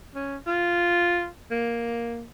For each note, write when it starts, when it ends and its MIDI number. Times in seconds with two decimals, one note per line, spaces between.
0.15 0.36 61
0.47 1.29 65
1.51 2.24 58